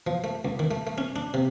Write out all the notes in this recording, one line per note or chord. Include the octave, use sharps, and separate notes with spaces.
F3
A3
C#2
D#3
A3
A3
C#4
D4
C3